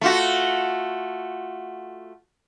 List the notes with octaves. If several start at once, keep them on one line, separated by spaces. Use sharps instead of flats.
A3 F4 F#4